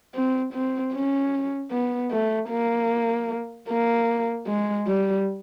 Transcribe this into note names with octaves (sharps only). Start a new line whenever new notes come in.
C4
C4
C#4
B3
A3
A#3
A#3
G#3
G3